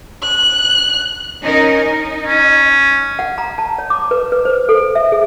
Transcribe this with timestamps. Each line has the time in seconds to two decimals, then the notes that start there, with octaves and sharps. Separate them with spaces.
0.23 F#6
1.41 C#4 D#4 A#4
1.77 D#4
2.27 C#4
3.19 F#5
3.38 A#5
3.58 A5
3.78 C#5
3.90 D6
4.11 B4
4.32 B4
4.45 C5
4.69 A4
4.95 E5
5.12 G#4